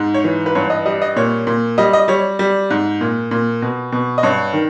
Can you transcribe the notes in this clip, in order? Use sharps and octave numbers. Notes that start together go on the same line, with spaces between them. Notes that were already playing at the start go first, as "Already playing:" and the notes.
Already playing: G#2
C#5
E3
B4
G2 C#5
D#5
G3 D#5
D#5
A#2 C#5
A#2
G3 D#5
D#5
G3 C#5
G3
G#2
A#2
A#2
B2
B2
D#5
G2 C#5
D#3